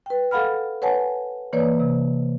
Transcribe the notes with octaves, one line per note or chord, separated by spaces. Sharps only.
B4 G5
A4 F5 F#5 B5 F6
B4 C#5 F#5 G#5 A5
E3 A#3 B4 C#5 D5
C3